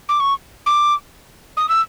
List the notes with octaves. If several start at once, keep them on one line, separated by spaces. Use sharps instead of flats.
D6
C#6
D6
D#6
E6